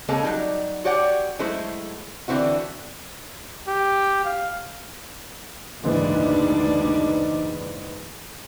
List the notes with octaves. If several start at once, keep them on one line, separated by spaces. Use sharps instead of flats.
C#3 G#3 A#3 C4 C#4 A4
F#3 G3 D#4
F#4 G4 C#5 D5 F#5 G5
F#3 G#3 A3 E4 C5
D3 E3 C4 E4 F#4
G4
F5
F#1 D2 G#2 E3 G3 D4 D#4